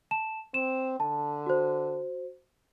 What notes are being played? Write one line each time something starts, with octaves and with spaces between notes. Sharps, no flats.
A5 E7
C4 E7
D3 A5
F#4 C5